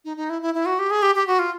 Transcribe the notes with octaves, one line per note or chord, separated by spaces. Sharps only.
D#4
D#4
E4
E4
E4
F#4
G4
G#4
G4
G4
F#4
F4